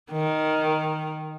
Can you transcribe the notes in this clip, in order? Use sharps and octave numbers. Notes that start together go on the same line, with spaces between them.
D#3